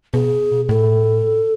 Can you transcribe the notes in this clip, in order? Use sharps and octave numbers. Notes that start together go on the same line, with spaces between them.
B2 G#4
A2 A4